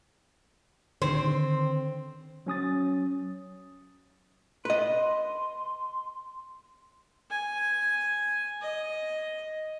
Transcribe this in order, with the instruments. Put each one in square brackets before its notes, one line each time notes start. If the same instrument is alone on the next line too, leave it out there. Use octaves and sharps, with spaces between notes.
[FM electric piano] D3 D#3 [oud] C4
[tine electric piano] F#3 C#4 D#6 A6
[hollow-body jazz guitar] B4 D#5 [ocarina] C6
[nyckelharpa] G#5
D#5